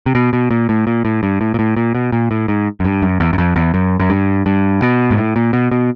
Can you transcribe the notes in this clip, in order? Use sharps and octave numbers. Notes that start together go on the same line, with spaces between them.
C3
B2
B2
A#2
A2
A#2
A2
G2
A2
A#2
A2
A#2
B2
A#2
A2
G#2
F#2
G2
F#2
E2
F#2
F2
E2
F#2
F#2
G2
G2
B2
G#2
A2
A#2
B2
B2